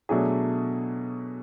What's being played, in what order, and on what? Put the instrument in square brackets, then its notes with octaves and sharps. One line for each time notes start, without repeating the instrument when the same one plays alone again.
[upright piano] B2 F#3 A3 D4 G#4